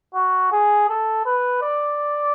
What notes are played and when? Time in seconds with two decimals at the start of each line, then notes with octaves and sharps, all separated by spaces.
0.15 F#4
0.52 G#4
0.89 A4
1.26 B4
1.62 D5